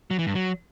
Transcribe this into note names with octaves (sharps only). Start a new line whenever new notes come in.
F#3
E3
G2
F#3